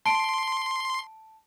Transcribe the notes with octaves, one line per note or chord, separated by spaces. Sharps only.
A5 C6 D7